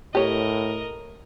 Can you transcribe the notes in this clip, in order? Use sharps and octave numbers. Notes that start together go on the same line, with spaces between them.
A2 G4 A#4 C#5 D#5